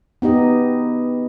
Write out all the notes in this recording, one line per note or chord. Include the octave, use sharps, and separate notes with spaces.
B3 D#4 G4 D#5